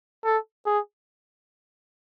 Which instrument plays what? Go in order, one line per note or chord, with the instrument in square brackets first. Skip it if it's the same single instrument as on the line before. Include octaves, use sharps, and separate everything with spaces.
[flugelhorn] A4
G#4